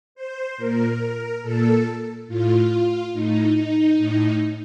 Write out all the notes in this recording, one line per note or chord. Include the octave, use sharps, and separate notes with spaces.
C5
A#2 A#4
A#2 A4
A2 F4
A2 D#4
D#4
A2